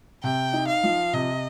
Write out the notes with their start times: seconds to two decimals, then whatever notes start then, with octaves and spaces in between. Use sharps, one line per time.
0.23 C3 G5
0.53 D#4
0.68 F5
0.83 F3
1.13 C3 D#5